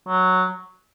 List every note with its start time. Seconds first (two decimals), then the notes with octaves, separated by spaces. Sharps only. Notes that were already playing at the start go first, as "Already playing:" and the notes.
0.08 F#3